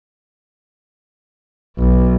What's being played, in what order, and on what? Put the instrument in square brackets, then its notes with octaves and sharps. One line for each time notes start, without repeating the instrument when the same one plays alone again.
[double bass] B1